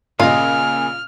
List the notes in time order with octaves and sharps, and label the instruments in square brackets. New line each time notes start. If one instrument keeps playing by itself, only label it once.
[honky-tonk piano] A#2 C#3 [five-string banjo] F4 D#5 [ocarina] G#5 [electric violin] F6